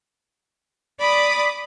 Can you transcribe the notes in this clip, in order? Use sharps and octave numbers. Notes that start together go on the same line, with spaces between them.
D5 B5 D6 D#6